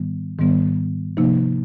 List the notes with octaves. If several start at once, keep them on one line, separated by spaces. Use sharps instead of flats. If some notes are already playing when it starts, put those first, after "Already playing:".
Already playing: G#2 D#3 G3 B3
G#2 D#3 G3 B3
C3 F3 A#3 D#4